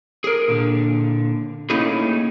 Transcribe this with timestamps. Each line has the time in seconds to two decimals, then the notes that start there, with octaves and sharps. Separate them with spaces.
0.24 G#4 A#4
0.48 A#2 D3
1.70 A3 A#3 C#4 D#4 E4 G#4